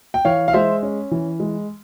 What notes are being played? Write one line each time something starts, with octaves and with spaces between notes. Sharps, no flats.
G5
E3 C#5 F5
F5
G#3 C5 E5
C#4
E3
G#3